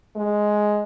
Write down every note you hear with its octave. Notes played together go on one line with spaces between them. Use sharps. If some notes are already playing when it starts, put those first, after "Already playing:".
G#3